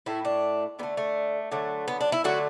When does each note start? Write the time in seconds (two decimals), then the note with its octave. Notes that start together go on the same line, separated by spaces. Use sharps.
0.06 A2 A3 E4
0.25 D4
0.79 D3 B3
0.83 A3
0.97 A3
1.52 D3 F#3 A3
1.88 B3
2.01 D4
2.12 E4
2.24 D3 F#3 A3 F#4